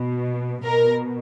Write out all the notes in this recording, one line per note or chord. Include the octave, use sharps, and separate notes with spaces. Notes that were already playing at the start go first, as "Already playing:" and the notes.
Already playing: B2
B2 A#4